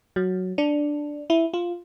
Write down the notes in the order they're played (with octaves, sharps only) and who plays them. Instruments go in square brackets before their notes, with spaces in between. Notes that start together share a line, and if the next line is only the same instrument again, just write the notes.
[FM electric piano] F#3
D4
E4
F4